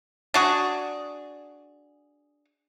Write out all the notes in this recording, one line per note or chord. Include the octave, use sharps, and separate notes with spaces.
D4 F#4 G#4